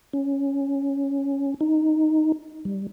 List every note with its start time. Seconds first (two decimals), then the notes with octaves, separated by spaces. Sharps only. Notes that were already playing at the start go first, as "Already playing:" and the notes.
0.13 C#4
1.61 D#4
2.65 G3